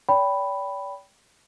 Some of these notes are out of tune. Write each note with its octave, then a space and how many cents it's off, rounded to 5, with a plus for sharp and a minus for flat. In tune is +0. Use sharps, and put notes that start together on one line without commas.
D5 -45 G5 +0 B5 +0